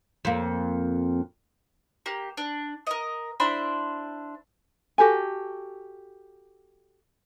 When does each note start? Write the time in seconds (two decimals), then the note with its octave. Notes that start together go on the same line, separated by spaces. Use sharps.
0.25 F2 A#3
2.06 A#3 G4
2.37 D4
2.87 A#4 D#5
3.40 D4 E4 C5 B5
4.98 F#4 G4 A4 G#5